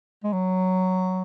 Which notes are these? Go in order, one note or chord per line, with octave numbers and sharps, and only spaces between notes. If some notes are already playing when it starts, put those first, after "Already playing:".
G#3
F#3